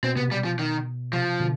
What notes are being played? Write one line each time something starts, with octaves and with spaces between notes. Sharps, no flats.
B2 C4
C3 B3
B2 G3
F3
D#3
C3 F3
B2 D3